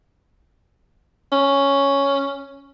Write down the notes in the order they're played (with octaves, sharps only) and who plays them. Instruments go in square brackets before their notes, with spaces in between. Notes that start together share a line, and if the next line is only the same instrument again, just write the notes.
[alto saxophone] C#4